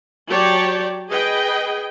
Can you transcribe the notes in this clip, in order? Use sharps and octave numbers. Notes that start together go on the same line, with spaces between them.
F#3 G4 C#5 D5 G5 A5
G#4 B4 D#5 G5